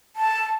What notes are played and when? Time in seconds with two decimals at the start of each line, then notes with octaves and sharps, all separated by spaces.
0.16 A5